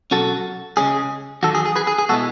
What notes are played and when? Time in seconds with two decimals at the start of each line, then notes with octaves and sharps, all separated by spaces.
0.11 B2 F#3 C#4 F#4 A4
0.77 C#2 C#3 G#3 C#4 G#4
1.43 E2 D#3 F#3 F#4 A4
1.55 G#4
1.66 G#4
1.76 G#4 B4
1.87 G#4
1.98 G#4
2.09 B2 G#3 B3 E4 F#4 A4